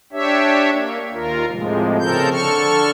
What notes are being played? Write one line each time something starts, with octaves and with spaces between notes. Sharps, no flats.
D4 G4 C#5 E5
A#3
D#2 F4 A#4
A2 C3 F3 G#3
C#3 F3 C4 A4 A#4 G6
D3 A4 C#6 F6